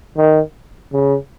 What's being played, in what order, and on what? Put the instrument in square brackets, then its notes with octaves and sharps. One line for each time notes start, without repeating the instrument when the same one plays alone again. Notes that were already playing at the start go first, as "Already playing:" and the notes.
[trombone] D#3
C#3